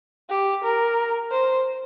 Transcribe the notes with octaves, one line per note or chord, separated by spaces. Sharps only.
G4
A#4
C5